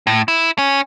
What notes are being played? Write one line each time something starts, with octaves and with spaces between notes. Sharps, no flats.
A2
E4
C#4